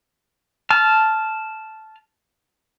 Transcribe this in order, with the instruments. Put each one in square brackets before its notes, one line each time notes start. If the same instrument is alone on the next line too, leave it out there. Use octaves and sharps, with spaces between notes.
[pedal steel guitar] A5 F6